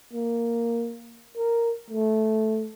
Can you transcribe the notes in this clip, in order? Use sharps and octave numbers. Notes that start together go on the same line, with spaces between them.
A#3
A#4
A3